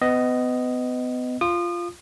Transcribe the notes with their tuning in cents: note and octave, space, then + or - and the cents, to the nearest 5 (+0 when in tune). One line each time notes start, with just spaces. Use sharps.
B3 +35 D#5 +0
F4 -10 D#6 -35